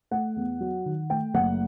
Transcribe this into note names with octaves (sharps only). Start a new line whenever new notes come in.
A3 F#5
E2
F#3
D#3
A3 G5
F#1 F#5